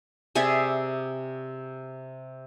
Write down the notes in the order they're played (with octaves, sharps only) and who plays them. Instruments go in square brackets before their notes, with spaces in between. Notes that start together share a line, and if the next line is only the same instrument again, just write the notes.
[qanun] C3 G#4 D5 E5